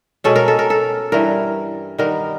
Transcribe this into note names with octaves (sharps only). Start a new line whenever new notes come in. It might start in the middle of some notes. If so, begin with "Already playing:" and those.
B2 G#3 C#4 A4
A#4
A4
A#4
A4
G2 E3 G3 A#4
D#3 G3 B3 A#4